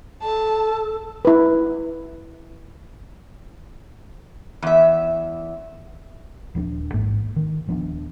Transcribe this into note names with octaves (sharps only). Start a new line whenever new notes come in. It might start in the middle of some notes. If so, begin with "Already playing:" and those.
A4 A5
E4 B4
E2 E5
D#1 F3 C#4 D4
A1 G#2 A#3
D#3
D#1 F3 B3 D4